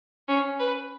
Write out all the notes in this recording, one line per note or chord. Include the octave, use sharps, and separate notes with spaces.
C#4
B4